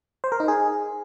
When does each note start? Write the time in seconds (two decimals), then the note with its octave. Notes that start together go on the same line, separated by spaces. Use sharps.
0.24 C5
0.32 A#4
0.40 D#4
0.48 G#4